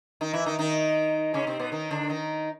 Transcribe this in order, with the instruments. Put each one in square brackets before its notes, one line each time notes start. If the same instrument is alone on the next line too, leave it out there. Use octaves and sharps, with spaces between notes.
[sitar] D#3 D#4
E3 E4
D#3 D#4
D#3 D#4
C#3 C#4
C3 C4
B2 B3
D#3 D#4
D3 D4
D#3 D#4